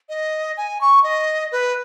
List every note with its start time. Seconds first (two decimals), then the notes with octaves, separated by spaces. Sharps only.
0.09 D#5
0.57 G#5
0.81 C#6
1.04 D#5
1.52 B4